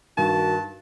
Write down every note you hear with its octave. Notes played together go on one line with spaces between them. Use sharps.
G2 D#3 F#4 A5